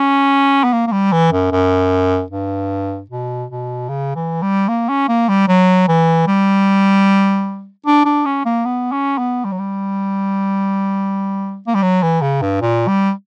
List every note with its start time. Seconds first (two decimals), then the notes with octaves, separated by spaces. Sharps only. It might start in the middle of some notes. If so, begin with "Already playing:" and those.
Already playing: C#4
0.64 B3
0.72 A#3
0.87 A#3
0.92 G3
1.12 E3
1.32 F#2
1.52 F#2
2.31 G2
3.10 B2
3.50 B2
3.89 C#3
4.16 E3
4.42 G3
4.68 A#3
4.89 C#4
5.08 A#3
5.29 G3
5.48 F#3
5.88 E3
6.27 G3
7.86 D4
8.05 D4
8.25 C#4
8.45 A#3
8.65 B3
8.92 C#4
9.18 B3
9.44 G3
9.52 F#3
9.59 G3
11.67 A#3
11.75 G3
11.82 F#3
12.02 E3
12.21 C#3
12.42 G2
12.61 A#2
12.88 G3